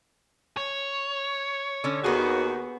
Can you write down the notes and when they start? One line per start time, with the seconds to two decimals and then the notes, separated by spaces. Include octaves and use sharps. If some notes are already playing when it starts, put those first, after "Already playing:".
0.57 C#5
1.84 D3 C#4
2.04 D#2 B3 F#4 G#4